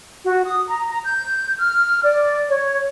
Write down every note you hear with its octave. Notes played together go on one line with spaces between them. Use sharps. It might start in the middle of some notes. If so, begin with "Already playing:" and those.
F#4
D#6
A#5
A#5
G6
F6
D5
C#5